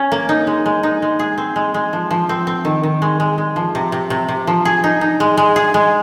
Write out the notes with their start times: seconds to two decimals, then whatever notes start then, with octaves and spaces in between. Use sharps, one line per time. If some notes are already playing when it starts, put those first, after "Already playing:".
Already playing: C#4
0.12 A#3
0.29 D#4
0.47 G#3
0.66 G#3
0.83 D#4
1.02 G#3
1.19 G#4
1.38 C4
1.56 G#3
1.74 G#3
1.93 F3
2.11 F3
2.29 C4
2.47 C4
2.65 D#3
2.83 D#3
3.02 G#3
3.20 G#3
3.38 G#3
3.56 F3
3.75 C3
3.92 C3
4.10 C3
4.29 C3
4.47 F3
4.65 G#4
4.84 D#4
5.01 D#4
5.20 G#3
5.37 G#3
5.56 G#4
5.74 G#3